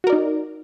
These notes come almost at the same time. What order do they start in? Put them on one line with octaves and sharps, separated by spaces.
F#4 A#4 D5 D#4